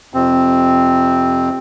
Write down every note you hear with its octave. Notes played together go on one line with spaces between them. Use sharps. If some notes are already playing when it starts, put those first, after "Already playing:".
F2 C3 C4